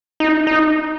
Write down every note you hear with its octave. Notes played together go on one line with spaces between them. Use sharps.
D#4
D#4